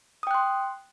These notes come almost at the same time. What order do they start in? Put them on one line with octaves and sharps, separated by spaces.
D#6 G5 F#6 C6